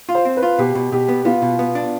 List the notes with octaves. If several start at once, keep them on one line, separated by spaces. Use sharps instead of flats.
F4
C5
C4
B4
F4
B2 G4
B2
B2 G4
B3
B3 F4
B2
B3
D4